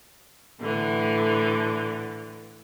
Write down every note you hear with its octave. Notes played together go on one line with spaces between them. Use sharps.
A2 D3 E3